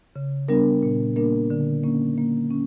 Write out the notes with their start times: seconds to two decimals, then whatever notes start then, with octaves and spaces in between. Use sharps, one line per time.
0.16 C#3
0.48 G3 B3 D4 A#4
0.83 A#2
1.16 A#3 D4 A#4
1.50 D3
1.83 A#3 C#4
2.18 A#3
2.51 C#4